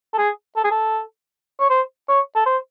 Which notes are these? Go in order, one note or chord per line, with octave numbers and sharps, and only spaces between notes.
A4
G#4
A4
G#4
A4
C#5
C5
C#5
A4
C5